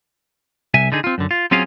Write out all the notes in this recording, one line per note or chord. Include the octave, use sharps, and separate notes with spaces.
C2 E5 G#5
D3 D#4 G#4
C4 F4
F#2 D3
F4
F#3 C4 C#4 F4 G#4 F5